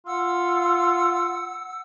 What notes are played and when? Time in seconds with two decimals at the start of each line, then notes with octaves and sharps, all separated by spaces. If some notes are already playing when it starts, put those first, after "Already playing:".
0.06 F4 F#5 E6